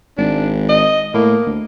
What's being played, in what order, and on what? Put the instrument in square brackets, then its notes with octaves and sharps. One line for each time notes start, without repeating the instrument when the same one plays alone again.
[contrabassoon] G#1 [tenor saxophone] D4
[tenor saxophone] D#5
[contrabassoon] A2 [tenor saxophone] A#3
[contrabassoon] D2